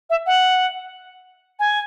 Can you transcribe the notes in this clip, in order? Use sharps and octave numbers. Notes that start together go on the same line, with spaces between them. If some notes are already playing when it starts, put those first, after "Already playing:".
E5
F#5
G#5